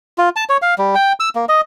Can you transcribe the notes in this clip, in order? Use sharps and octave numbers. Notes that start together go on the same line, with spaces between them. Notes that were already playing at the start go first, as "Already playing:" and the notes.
F4
A5
C#5
F5
G3
G5
E6
A#3
D#5